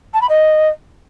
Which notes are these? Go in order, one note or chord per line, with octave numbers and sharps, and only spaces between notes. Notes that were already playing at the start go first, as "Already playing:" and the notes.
A5
B5
D#5